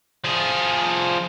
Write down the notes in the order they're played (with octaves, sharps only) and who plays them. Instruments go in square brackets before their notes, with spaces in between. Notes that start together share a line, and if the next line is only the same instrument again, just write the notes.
[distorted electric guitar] F3 G#4